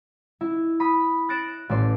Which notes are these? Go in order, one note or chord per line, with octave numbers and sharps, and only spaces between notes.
E4
B5 D#6 B6
F#6 A6 A#6 C#7 D7 E7
A1 C5 D5 C6